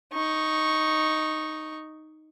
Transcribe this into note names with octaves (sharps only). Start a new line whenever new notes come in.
D#4 C#6